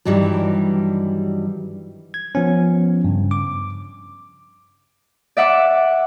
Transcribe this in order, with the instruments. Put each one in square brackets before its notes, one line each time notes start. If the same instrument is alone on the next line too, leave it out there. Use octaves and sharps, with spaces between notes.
[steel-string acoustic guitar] G2 D#3 E3 F#3 G3
[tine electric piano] G#6
F3 B3 C#4
G2 C#3
D6
[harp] D5 E5 F#5 D6